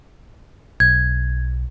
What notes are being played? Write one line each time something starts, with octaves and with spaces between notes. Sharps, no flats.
B1 G#6